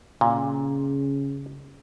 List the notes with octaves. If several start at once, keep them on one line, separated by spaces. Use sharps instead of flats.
A#2 C#3